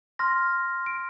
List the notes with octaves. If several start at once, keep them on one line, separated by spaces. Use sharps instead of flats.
C6 F6 A#6
D7